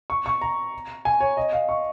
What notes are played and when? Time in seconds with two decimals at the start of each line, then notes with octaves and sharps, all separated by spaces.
0.10 C#6
0.26 C#6
0.41 A#5
1.05 G#5
1.21 C#5
1.37 D#5
1.53 F5
1.69 C#6